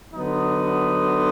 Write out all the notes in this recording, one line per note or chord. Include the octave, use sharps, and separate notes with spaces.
D3 F#3 B3 D#4